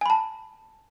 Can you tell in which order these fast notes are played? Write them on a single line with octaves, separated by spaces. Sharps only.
G#5 B5 A5